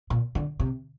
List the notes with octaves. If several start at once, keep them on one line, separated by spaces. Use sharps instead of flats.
A#2
D3
C3